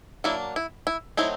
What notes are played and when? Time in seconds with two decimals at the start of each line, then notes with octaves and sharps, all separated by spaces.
0.24 F#3 A#3 D4 E4
0.56 E4
0.87 E4
1.17 F#3 A3 C4 D#4 E4